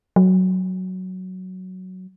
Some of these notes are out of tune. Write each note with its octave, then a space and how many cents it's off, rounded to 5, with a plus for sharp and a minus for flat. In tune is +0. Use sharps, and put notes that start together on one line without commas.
F#3 +5